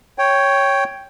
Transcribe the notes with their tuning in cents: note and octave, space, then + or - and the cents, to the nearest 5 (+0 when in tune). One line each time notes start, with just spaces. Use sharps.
C#5 +0 G5 +0